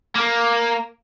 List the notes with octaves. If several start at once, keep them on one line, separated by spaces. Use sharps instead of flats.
A#3